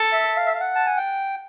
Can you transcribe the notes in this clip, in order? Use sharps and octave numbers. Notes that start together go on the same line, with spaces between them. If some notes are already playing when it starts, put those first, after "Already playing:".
Already playing: A4
E5
F5
E5
F5
F#5
A5
G#5
G5